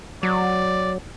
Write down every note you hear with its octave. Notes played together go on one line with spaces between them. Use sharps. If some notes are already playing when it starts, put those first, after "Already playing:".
F#3 D5